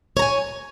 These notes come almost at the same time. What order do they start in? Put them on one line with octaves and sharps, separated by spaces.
C#5 A#5 G#5